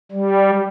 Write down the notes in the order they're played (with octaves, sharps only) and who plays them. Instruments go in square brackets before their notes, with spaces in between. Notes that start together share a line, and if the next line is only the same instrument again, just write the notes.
[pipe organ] G3